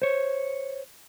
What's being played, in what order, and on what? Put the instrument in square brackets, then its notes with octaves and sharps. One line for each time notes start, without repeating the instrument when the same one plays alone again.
[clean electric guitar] C5 C#5